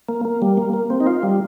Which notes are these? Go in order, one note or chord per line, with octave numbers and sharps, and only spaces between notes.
A#3
A#3
G3
A#3
A#3
C4
D#4
F4
G3